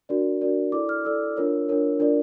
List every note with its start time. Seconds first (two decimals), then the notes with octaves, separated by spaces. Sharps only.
0.09 D4 F#4 A#4 D5
0.41 D4 F#4 A#4 D5
0.72 E4 A4 D5 D6
0.89 F6
1.05 E4 A4 D5 E6
1.37 D4 F4 A#4 C#5
1.69 D4 F4 A#4 C#5
1.99 D4 F4 A#4 D5